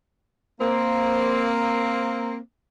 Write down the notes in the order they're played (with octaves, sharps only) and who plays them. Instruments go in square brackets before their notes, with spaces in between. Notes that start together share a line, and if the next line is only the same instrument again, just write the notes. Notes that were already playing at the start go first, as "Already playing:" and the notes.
[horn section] A#3 C4